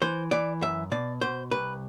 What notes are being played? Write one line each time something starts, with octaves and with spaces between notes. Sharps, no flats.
E3 C5
E3 D5
F#2 E5
B2 D5
B2 C5
C2 B4